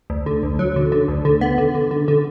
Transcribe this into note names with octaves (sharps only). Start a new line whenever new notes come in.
D2
D3
D2
F#3
D3
D3
D2
D3
B3
D3
D3
D3
D3